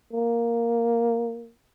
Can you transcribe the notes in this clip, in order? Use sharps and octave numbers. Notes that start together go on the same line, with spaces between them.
A#3